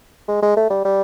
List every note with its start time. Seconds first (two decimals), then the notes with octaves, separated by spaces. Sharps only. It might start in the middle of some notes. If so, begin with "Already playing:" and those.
0.28 G#3
0.42 G#3
0.57 A3
0.70 G3
0.85 G3